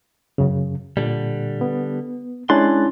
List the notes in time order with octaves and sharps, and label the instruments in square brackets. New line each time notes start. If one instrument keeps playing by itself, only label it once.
[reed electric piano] F#2 C#3
[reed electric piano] A#2 [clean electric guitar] D3 G3
[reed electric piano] B3
[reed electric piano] G#3 F#6 A6 [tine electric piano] C#4 D4 E4 [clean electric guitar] C6